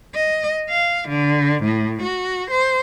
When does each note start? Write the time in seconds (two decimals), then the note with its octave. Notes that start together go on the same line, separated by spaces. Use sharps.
0.15 D#5
0.69 F5
1.09 D3
1.64 A2
2.02 F#4
2.51 C5